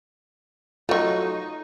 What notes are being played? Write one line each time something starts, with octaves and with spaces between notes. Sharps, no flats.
F#3 A3 D#4 F4 C#6